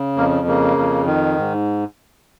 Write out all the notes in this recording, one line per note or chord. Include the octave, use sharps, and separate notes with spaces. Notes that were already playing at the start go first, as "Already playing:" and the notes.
Already playing: C#3
F2 A#3
C#3 A#3
F2
D#3
G#2